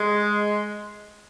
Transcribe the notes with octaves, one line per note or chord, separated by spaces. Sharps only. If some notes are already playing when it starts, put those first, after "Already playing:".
Already playing: G#3